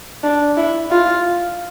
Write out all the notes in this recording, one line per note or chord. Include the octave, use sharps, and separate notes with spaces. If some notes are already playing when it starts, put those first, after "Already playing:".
D4
E4
F4